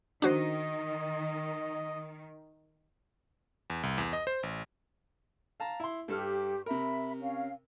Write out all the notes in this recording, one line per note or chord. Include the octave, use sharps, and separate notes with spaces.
D#3 D4 F#4 C5 D#5
E2
C2
E2
D#5
C5
A1
F5 A5 A#5
E4 C6
G2 G4 A4 F6
C3 A#4 E5 B5
C#4 F5